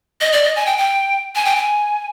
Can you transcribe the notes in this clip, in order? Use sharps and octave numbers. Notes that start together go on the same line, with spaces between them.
D#5
D5
D#5
G#5
G5
G5
G#5
G5
G#5